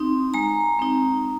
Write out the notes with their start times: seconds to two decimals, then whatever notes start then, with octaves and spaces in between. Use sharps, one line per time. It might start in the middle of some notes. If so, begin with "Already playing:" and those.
Already playing: C4 D#4 C6
0.34 G#3 A#5
0.79 C4 D#4